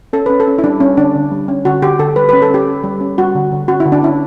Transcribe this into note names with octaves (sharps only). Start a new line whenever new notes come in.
C#4 A4
C#4 B4
A4
C#4
E4
G3 D4
G3 C#4
D3 D4
D3
G3
C#4
D3 F#4
D3 G4
D3 A4
G3 B4
B4
C#4
A4
C#4 G4
C#4
G3
C#4
G3 F#4
D3
D3
C#4 F#4
E4
D3
D4
C#4 E4